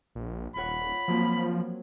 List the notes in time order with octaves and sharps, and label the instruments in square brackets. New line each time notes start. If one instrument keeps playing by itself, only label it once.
[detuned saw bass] A#1
[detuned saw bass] D#1 [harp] F4 C#5 F#5 [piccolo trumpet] B5
[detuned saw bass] F3 [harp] F#3 A#3 C4